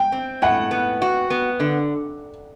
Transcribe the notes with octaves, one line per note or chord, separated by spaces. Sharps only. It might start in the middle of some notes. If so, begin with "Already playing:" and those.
Already playing: G5
C4
A2 F#5
B3
F#4
B3
D3